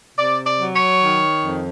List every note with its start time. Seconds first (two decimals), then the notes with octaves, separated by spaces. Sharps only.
0.17 C3 D5
0.46 D5
0.59 F#3
0.74 C#5
1.03 D#3
1.45 F2